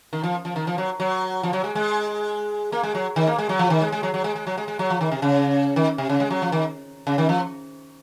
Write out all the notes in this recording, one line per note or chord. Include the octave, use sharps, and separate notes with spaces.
D#3
F3
F3
D#3
F3
F#3
F#3
F3
F#3
G#3
G#3
A#3
G#3
F#3
D#3
A#3
G#3
F#3
F3
D#3
G#3
G#3
F#3
F#3
G#3
G#3
F#3
G#3
G#3
F#3
F3
D#3
C3
C#3
D#3
C3
C#3
G#3
F#3
F3
D#3
C#3
D#3
F3